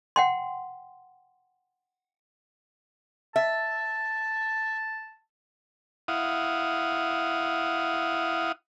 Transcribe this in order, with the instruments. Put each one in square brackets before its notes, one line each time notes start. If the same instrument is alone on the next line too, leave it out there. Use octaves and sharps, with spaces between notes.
[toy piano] F#5 G5 C6
[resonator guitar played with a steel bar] E5 [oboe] A5
[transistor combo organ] E4 F5 F#5 D#6